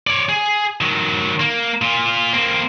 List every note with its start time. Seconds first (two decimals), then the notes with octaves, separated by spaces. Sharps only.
0.07 C#5 D5
0.29 G#4
0.81 D#3 F#3
1.40 A#3
1.82 A#2 F4
2.33 A#3 C4